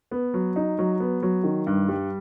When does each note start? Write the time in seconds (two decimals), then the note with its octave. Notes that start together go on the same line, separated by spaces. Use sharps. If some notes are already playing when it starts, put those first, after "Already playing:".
0.11 B3
0.34 F#3
0.56 D#4
0.78 F#3
1.00 B3
1.23 F#3
1.44 D#3
1.67 G2
1.89 G3